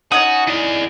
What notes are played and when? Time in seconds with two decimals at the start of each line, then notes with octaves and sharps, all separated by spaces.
0.12 C#4 D#4 F#4 D#6
0.47 E3 D5